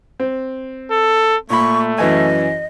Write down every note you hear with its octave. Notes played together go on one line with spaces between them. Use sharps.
C4
A4
A#2 A3 B5 C#6
F#2 E3 D#5 G#5